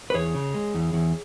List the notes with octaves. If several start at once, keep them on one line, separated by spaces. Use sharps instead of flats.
B4
E2 G#4 C#5
C#3
G#3
E2
E2